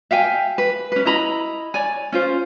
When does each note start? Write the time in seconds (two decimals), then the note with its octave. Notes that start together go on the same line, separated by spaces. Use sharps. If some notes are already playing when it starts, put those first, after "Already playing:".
0.11 E5 F5 G5 G#5
0.58 B4
0.92 C#4 B4
1.05 E4 D#5 A#5 B5
1.74 C#5 D5 G#5
2.12 C#4 F4 C5